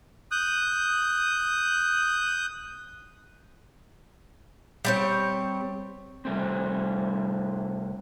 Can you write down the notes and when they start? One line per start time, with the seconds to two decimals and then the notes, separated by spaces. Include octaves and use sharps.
0.31 D#6 F#6 G6
4.85 G3 C4 C#5
6.25 C3 G3 A3 C4